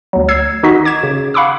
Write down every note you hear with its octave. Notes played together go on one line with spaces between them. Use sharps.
D2 F#3
E6 G#6 C7
D#3 D#4 F#4 D#5 B6
D6 G#6 C7 E7
C#3
F5 F#5 B5 C#6 D6 E6